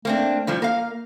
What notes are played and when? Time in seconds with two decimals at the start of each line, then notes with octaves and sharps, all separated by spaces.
0.05 A3 A#3 C4 D4
0.47 A2 F3 G3
0.62 A#3 A#4 F5